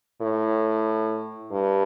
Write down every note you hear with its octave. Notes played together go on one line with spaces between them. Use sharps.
A2
G2